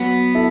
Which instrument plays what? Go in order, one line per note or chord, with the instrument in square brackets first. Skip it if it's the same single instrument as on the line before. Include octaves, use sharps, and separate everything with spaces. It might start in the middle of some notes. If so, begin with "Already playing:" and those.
Already playing: [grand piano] F#3 [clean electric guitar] B3
[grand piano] E4 A4